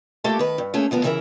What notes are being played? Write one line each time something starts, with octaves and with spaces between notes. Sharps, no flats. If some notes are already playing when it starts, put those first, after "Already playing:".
A3 A#3 F4 G4 A4
D#3 B4
G2
A3 A#3 C#4 G#4
D2 F3 B3 A#4
C#3 E3 E4 A#4 E5